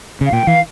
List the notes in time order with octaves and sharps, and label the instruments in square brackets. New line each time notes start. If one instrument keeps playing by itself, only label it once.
[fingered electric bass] C#3 [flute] F5
[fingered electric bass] A#2 [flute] G5
[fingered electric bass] E3 [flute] F5